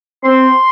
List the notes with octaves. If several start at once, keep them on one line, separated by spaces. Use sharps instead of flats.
C4 C6